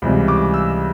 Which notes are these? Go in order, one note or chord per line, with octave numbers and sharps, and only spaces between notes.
C#2 C3 E3 G3
D6
E6